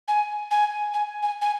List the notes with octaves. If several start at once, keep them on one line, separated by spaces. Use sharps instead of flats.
G#5
G#5
G#5
G#5
G#5